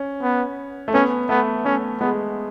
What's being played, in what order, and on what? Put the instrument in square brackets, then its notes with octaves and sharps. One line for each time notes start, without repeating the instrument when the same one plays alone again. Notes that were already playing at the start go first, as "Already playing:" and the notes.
Already playing: [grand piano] C#4
[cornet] B3
[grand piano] A3
[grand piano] B3 [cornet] C#4
[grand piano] A3 [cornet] B3
[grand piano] A3 [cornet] C#4
[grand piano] G#3 [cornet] B3